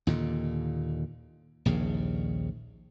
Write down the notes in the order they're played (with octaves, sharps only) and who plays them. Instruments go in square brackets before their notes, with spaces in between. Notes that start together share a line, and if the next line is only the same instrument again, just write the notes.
[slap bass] D#2 A#2 D3
A#1 D#2 C#3